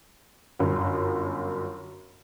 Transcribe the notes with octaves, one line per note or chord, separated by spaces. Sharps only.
G1 F#2